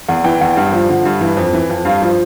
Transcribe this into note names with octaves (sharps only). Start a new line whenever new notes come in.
E2
E3 G5
E2
G2
F3
D3
G2
E3
F2
E3
F2
G2 F5
F3